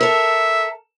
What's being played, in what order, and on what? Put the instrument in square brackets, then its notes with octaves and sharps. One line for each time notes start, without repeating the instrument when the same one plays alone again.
[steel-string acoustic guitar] A4 A#4 [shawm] E5